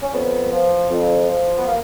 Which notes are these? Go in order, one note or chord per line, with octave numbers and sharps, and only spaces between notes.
C#4
F2 B3
F3
F2
F3
B3
A#3